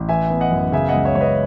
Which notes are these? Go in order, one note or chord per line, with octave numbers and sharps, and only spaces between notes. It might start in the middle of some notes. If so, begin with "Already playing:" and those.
Already playing: A1
E3 E5 G#5
B3
D#5 F#5
F#2
C#3 E5 G#5
D#5 F#5
C#2
C#5 E5
C#2 C#5
B4 D#5